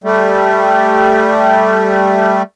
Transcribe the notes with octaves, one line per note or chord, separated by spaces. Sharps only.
G3 A3